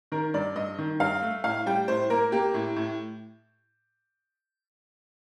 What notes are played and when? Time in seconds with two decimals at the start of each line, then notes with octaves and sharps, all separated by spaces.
0.12 D#3 A#4
0.34 G2 D5
0.56 G2 D#5
0.78 D#3
1.00 G2 F5
1.22 A3
1.44 A2 F5
1.66 G3 G5
1.88 A2 C5
2.10 A#3 A#4
2.32 A#3 G4
2.54 A2
2.76 A2